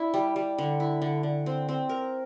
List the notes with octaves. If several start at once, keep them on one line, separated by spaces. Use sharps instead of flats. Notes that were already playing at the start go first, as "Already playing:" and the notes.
Already playing: D4 E4
G3
G3
D3
E4
D3
D3
C4
C4
A#4